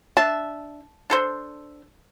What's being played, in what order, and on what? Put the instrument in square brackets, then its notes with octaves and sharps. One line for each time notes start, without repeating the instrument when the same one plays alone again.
[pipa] D4 E5 [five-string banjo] A5
[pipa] D4 A4 C5